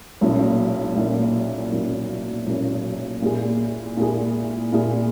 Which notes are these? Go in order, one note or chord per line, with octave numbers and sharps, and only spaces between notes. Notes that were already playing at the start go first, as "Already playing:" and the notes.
B1 A#2 A#3 C#4 E4
B1 A#2 A#3 C#4 E4
B1 A#2 A#3 C#4 E4
B1 A#2 A#3 C#4 E4
A#2 A#3 E4 G#4
A#2 A#3 E4 G#4
A#2 A#3 E4 G#4